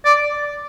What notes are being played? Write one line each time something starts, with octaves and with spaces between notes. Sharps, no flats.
D5